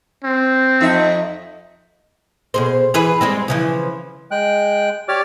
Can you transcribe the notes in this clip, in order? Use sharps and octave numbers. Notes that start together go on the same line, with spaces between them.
C4
F2 D#4 E5
B2 G#4 C5
E3 G#4 B4
G3 G#3 C4
C#3 E3 F3
G#3 G5 F#6
G4 C#5 D5 D6 F6